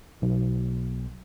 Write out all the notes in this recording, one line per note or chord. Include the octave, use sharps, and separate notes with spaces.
B1